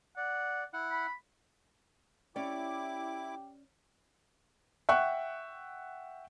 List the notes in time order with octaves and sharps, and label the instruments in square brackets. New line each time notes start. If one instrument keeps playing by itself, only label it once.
[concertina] D5 [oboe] F#5
[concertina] E4 F#5
[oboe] B5
[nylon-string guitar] C#4 D5 [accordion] E4 D6 [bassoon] G4
[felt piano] E5 F#5 G5 C#6 F#6